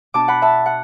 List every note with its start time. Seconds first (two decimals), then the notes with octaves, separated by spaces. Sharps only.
0.14 B2 B3 D4 A5 D6
0.28 F#5 B5
0.42 E5 A5
0.66 F#5